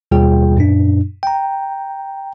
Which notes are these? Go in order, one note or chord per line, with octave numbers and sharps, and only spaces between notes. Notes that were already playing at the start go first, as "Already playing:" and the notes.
D#2 B2 G3 F4 G#4 G5
F#2 A#2 D4
G5 A#5